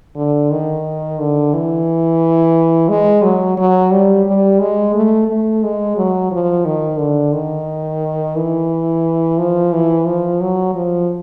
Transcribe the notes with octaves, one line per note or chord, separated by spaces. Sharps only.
D3
D#3
D3
E3
G#3
F#3
F#3
G3
G3
G#3
A3
A3
G#3
F#3
F3
D#3
D3
D#3
E3
F3
E3
F3
F#3
F3